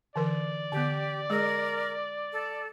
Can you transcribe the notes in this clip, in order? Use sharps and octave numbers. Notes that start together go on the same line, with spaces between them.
D3 E3 A#4 D5
D3 B3 G4
G#3 G#4 A#4
A4